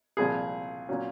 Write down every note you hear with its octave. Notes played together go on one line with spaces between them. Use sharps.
C2 A#2 F3 G#4
A#2 F#3 C#4